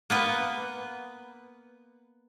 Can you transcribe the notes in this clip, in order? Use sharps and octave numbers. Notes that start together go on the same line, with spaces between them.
A#3 B3 B4